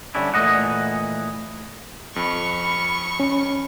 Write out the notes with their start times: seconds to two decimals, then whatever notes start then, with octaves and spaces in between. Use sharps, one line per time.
0.15 D3 G3 C#4 D4 E4
0.34 A#2 E3 A3 C4 D#5 F#5
2.16 F2 B5 C#6
3.20 C#4